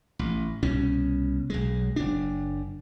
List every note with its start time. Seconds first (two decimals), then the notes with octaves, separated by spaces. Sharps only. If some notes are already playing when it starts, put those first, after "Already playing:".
0.19 A1
0.63 C2 B2 C#4
1.50 B1 G#3
1.96 F#1 D4